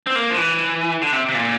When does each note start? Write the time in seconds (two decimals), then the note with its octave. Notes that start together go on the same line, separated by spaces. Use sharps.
0.07 C4
0.15 A#3
0.30 F3
0.37 E3
1.02 D3
1.13 C3
1.29 C3
1.35 A#2